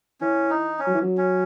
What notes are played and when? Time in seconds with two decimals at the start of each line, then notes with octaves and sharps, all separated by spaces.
0.21 E3 C#4
0.50 D#4
0.79 C#4
0.86 F#3
0.94 E3
1.02 F#3
1.17 C#4